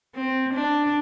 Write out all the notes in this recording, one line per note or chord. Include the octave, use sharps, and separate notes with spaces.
C4
D4